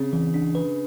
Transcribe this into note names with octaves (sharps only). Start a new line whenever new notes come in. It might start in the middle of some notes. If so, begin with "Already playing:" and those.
Already playing: C#3 C4
E3
D4
B4